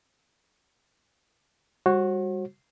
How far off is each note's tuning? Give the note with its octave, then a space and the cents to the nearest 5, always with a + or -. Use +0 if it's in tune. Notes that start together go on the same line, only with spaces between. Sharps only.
G3 +20 F#4 +0 C#5 -45